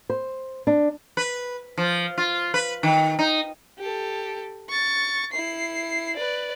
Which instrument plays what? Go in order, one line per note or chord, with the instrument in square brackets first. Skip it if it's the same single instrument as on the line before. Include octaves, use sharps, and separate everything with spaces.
[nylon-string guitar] C5
D4
[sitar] B4
F3
F4
B4
D#3
D#4
[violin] G4 A4
C#6 A6
E4 C7
B4 D5